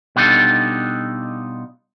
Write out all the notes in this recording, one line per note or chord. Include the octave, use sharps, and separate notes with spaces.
B2 G3 D4 D#4 F4 A4